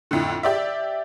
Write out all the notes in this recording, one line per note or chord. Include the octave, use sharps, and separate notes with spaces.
F2 A2 D3
G4 D5 E5